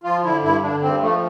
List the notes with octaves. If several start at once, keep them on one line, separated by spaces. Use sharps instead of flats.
F3 F4
D3 E4
G2 E4
D3 D4
G2 C4
F3 A3